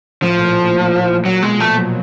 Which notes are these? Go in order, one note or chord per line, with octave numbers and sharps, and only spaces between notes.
A2 F3
A#2
A#2
A2
A#2
A#2
A#2
A#2 F#3
B2 G#3
F3 A3
F#3